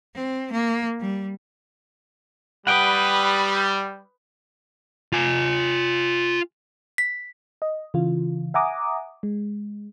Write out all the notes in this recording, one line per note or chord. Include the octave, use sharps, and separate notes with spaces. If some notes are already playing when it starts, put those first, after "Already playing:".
C4
A#3
G3
G3 B4 F#5 G5 D#6
F4 G#5
B6
D#5
C#3 E3 F4
E5 F#5 G#5 A#5 D6 D#6
G#3